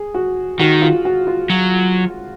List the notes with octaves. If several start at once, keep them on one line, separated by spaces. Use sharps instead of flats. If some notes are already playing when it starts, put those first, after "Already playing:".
Already playing: G#4
F#4
D#3 F#4
F4
F#4
F4
F#3